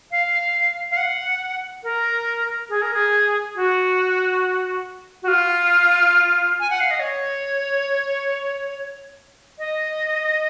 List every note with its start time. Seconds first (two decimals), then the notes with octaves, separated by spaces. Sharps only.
0.11 F5
0.91 F5
0.97 F#5
1.84 A#4
2.69 G#4
2.82 A#4
2.94 G#4
3.55 F#4
5.22 F#4
5.28 F4
6.60 G#5
6.70 F#5
6.80 F5
6.91 D#5
7.00 C#5
9.59 D#5